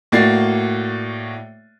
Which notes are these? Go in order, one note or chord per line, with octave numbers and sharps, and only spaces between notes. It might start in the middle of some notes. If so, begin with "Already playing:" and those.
A2 A#3 F#4 D5 A6 C7